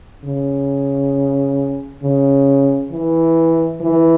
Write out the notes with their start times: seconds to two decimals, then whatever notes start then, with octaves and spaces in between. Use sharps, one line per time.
0.25 C#3
2.03 C#3
2.92 E3
3.82 E3